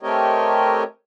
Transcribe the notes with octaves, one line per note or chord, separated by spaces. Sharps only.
A3 C4 G4 A#4 C#5 D#5